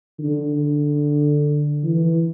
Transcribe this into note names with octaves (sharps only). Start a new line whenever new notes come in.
D3
E3